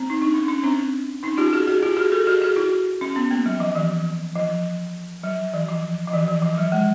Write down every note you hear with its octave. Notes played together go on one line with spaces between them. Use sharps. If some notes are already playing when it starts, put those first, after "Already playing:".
Already playing: C4
D#4
D4
C#4
C#4
C4 D4
C#4 D#4
F4 G4
G4
F#4 G#4
F#4 G#4
F4 G4
F#4 G#4
G4 A4
F#4 G#4
F#4 G#4
E4 F#4
C#4
B3
A#3
F#3
F3
E3
F3
F#3
E3
F3
F3
E3
E3
F3
F#3
G#3